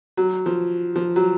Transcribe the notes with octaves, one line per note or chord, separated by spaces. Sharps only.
F#3
F3
F3
F#3